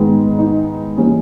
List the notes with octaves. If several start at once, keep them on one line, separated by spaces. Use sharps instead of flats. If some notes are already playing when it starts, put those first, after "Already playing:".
Already playing: G#2 D#3 G#3 B3
D#4
E3 G3 A#3 C#4